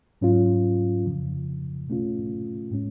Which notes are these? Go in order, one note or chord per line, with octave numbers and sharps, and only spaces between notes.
G#2 F#3 C#4 F4
F2 C#3 F3
B2 A3 C#4 F4
A2 G#3 C#4